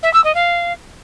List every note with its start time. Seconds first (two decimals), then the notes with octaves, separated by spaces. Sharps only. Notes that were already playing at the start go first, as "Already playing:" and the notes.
0.03 E5
0.13 E6
0.24 D#5
0.34 F5